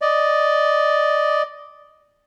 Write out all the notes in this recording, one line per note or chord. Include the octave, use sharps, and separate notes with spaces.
D5 D#5